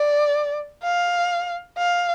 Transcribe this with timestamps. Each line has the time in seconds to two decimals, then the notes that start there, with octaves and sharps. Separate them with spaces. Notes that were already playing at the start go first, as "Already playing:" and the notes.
Already playing: D5
0.83 F5
1.78 F5